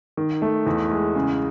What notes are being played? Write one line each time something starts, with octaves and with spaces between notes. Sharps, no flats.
D#3
A3
E2
G#3
C#3